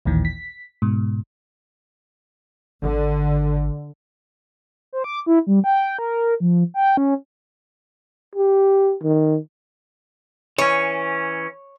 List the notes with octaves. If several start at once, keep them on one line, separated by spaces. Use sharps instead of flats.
A1 D#2 A#2 D#3 E3
B6
G#2 B2
G#1 D3
C5
D6
E4
G3
G5
A#4
F3
G5
C#4
G4
D#3
E3 C#4 C#5